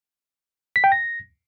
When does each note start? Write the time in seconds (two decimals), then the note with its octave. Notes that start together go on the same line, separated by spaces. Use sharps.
0.76 B6
0.84 G5
0.92 A#6